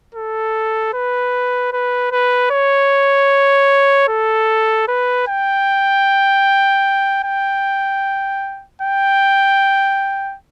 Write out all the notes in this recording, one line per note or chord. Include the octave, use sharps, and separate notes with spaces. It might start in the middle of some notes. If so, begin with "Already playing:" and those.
A4
B4
B4
B4
C#5
A4
B4
G5
G5
G5